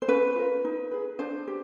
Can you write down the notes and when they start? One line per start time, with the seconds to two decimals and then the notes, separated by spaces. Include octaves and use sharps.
0.02 C5
0.08 C#4 B4
0.36 F4 A#4
0.65 D#4
0.91 G#4 B4
1.19 D4 C5
1.47 G4